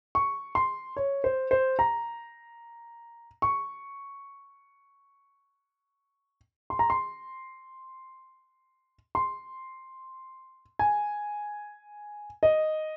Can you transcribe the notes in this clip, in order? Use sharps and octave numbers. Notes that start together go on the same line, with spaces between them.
C#6
C6
C#5
C5
C5
A#5
C#6
C6
A#5
C6
C6
G#5
D#5